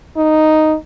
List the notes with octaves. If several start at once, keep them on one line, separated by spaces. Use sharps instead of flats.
D#4